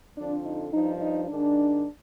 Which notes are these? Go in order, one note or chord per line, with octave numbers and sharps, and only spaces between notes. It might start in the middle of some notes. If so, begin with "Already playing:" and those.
F2 D3 F3 D4
D#4
G2 F3 D#4
D#4
G#2 D#3 D4